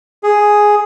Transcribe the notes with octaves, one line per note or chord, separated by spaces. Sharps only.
G#4